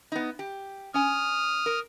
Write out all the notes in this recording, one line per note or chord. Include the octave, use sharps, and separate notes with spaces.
B3 D#4
G4
C#4 G#5 D#6 F6
A#4